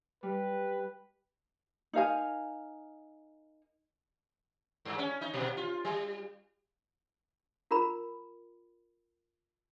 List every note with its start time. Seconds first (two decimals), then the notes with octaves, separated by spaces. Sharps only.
0.23 G3 B4
1.93 D#4 A#4 F5 G#5
4.85 G2
4.98 C#4
5.21 D#4
5.34 A#2
5.57 F4
5.85 G3
7.71 F4 A#4 A#5 B5